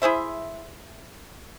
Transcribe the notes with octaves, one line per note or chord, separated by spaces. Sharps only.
E4 G#4 C5 E5